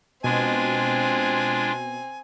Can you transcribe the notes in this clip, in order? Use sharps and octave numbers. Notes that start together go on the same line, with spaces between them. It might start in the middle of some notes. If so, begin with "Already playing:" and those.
B2 G#3 C4 D4 F4 G#5